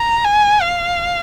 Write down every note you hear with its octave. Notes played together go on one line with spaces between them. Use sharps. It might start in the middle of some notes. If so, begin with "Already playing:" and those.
Already playing: A#5
G#5
F5